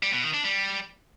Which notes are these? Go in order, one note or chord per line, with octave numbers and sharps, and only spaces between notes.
G3
B2
D#3
D4
G3